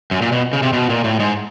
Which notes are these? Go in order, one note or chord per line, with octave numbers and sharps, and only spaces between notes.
F#2
A#2
B2
C#3
C3
B2
A#2
A2
G#2